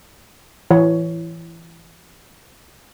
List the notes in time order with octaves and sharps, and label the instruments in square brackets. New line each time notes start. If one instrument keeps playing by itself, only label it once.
[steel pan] E3 C#5